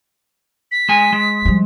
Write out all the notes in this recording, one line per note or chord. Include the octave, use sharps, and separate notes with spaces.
B6
G#3 G#5
G#3
F3 G3